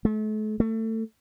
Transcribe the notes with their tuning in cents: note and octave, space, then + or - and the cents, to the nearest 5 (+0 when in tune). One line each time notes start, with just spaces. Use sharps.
A3 -40
A3 +25